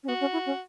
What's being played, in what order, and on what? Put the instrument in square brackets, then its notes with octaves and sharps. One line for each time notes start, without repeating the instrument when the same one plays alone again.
[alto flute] C#4
[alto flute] B3 [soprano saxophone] F#4
[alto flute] C#4
E4
C#4